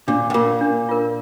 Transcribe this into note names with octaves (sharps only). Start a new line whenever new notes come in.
A#2 D4
A2
A#2 F4 A#4
D4
F4 A#4